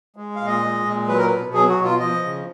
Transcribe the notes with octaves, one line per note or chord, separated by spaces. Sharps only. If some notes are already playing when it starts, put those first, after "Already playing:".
G#3
A#2 F5
D#5
G#3
A#2
F#3 B4
A#4
B2 B4
F#3 G#4
F#4
B2
F4
F3 D#5
C#3